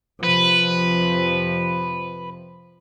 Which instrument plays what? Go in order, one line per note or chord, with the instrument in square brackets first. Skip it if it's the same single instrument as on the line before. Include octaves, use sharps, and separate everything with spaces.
[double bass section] F2 C3 F3 [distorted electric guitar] B4